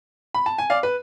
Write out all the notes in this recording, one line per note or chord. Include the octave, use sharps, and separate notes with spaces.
B5
A5
G#5
D5 F5
B4